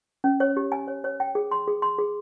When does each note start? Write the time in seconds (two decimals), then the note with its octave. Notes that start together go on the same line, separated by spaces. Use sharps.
0.24 C#4
0.40 C#5
0.57 G4
0.72 G#5
0.88 C#5
1.04 C#5
1.20 G5
1.35 G#4
1.51 C6
1.68 G#4
1.82 C6
1.98 G#4